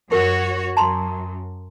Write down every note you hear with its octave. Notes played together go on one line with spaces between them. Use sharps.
F#2 F#4 G4 A#4 C#5
F#2 A5 A#5 C6